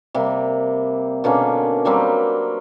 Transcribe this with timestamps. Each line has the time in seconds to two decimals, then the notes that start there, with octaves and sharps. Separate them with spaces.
0.14 C3 G3 A#3
1.24 B2 D3 A#3 C#4
1.85 F#3 G3 A#3 C4